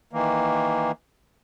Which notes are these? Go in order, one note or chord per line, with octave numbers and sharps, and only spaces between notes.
D#3 E3 A#3